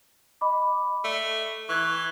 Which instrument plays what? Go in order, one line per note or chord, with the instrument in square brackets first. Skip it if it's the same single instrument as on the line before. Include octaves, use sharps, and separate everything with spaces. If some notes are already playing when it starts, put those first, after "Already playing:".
[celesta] D#5 B5 D6
[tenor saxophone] A3 [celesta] D5
[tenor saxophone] E3 [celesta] C#6 F#6 G#6